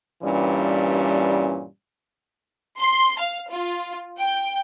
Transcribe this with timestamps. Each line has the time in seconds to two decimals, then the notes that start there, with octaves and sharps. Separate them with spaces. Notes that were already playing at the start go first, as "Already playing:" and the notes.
0.23 G2 A#2 E3 G3 C#4
2.79 C6
3.19 F5
3.51 F4
4.18 G5